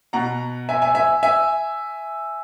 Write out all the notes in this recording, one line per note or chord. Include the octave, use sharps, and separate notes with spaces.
B2 F#5 A#5
E5 G#5
E5 G#5
E5 G#5
E5 G#5